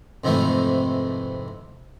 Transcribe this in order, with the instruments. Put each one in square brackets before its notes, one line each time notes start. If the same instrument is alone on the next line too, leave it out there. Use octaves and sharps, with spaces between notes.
[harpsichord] F2 G#2 C3 E3 A3